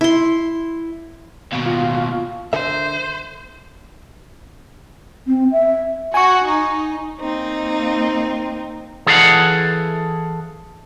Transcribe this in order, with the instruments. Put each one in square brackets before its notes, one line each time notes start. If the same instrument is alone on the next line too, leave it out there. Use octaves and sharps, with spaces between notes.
[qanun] E4 C6
[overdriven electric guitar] D#2 B2
[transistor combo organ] F4
[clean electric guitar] D3 A#4 E5 [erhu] C5
[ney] C4
E5
[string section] F#4 [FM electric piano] G#5 C#6
[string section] D#4
[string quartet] A#3 C4 D#4
[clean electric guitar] E3 G#4 A4 B4 F5 F#5